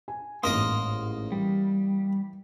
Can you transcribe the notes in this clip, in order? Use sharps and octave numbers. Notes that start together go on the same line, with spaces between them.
G#5
A1 G#2 A#3 A#4 D#5 C6 D#6
E3 G3